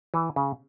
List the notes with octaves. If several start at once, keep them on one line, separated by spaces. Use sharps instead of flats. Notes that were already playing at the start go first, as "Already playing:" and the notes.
E3
C#3